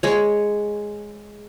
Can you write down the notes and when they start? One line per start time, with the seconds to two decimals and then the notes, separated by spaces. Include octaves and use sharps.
0.03 G#3 C#5